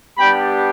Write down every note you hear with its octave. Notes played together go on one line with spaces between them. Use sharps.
G3 B3 D4 G4 G5 B5